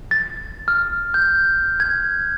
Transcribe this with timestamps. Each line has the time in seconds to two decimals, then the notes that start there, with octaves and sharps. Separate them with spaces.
0.11 A6
0.68 F6
1.14 G6
1.80 G#6